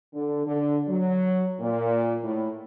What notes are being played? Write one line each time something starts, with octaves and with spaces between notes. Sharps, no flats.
D3
D3
F#3
A#2
A2